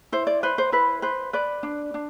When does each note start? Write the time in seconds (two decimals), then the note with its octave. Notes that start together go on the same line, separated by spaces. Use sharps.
0.12 E4 C5
0.27 D5
0.43 B4 C5
0.58 C5
0.72 E4 B4
1.02 B4 C5
1.33 B4 D5
1.63 D4
1.94 D4